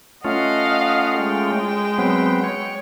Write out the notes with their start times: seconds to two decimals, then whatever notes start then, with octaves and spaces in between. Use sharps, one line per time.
0.24 A3 C#4 F4 D#5 F5 F#5
1.16 G#3 G5
1.98 F#3 B3 C4
2.44 C#5